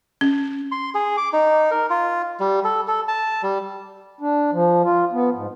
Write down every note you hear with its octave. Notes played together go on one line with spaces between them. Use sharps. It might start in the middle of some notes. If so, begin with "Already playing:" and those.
C#4
C6
G#4
D6
D#4
A#4
F4
G3
A4
A4
A5
G3
D4
F3
F4
B3
G#2